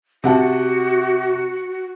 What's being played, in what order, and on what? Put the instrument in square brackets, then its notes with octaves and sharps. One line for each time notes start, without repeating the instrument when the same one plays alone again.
[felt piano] C3 F#5 A5 [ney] F#4